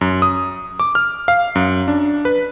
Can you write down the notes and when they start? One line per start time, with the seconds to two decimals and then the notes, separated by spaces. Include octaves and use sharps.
0.01 F#2
0.22 D#6
0.80 D6
0.95 F6
1.28 F5
1.55 F#2
1.88 D4
2.25 B4